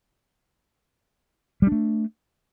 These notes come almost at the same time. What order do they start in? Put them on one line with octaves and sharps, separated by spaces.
G3 D4 A3